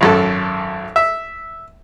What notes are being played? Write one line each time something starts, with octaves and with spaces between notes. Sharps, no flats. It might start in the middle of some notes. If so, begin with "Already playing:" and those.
G#1 F#2 A4
E5